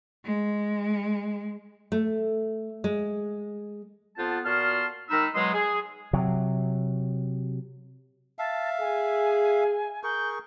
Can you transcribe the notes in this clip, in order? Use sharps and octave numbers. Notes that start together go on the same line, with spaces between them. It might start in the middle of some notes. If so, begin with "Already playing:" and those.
G#3
A3
G#3
F2 B3 F4 C5 F#5 A5
A#2 B3 F#4 A5 C6 F6
D#3 G#3 D#4 A#4 B5 E6
B2 F#3 G#3 B3 D#5 C6
G#4
C3 F#3
E5 F5 A5
G#4 G#5
G#4 A#4 C#6 G6